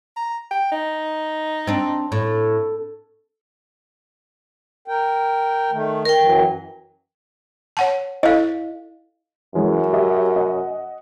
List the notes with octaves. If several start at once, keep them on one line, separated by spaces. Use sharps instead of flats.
A#5
G5
D#4
C4 D4
A2
A#4 G5
D#3 A3
A#4 G5
F#2 E3 F#3
C#5 F#5 A5
E4 A4 D#5 F5
F#2 E3 G#3 C#4
G4 D#5 E5
D#5 F#5